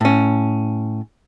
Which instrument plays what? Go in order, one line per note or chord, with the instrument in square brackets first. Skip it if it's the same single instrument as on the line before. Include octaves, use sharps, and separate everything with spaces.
[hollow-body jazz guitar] A2 C#4